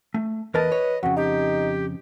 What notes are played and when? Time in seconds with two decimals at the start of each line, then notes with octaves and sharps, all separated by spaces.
0.14 A3
0.54 E2 A#4 B4 D#5 A5
0.72 C#5
1.03 F2 C#3 F#4
1.16 D#4 G4